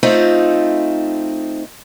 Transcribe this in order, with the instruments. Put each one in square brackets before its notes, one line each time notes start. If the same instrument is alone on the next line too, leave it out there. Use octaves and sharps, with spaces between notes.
[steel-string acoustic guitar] A3 C4 D#4 F4